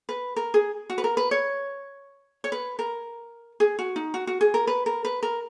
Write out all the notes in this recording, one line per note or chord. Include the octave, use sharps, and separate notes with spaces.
B4
A#4
G#4
F#4
B4
A#4
B4
C#5
C#5
B4
A#4
G#4
F#4
D#4
F#4
F#4
G#4
A#4
B4
A#4
B4
A#4